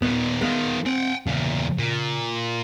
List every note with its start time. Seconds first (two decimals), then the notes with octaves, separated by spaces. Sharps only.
0.02 D#2 A#2 B3
0.41 D#3 G#3 B3 F4
0.86 C4 F#5 G5
1.27 E2 A#2 C#3
1.78 A#2